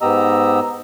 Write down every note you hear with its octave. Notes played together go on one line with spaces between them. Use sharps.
G#2 B3 G4 D#5 A#5 E6